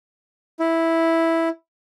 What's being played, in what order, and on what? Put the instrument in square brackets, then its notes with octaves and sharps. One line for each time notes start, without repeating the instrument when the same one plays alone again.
[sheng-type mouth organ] E4